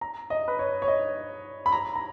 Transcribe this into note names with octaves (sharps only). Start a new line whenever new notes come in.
A#5
D#5
B4
C#5
C#5
D#5
B5
A#5
A#5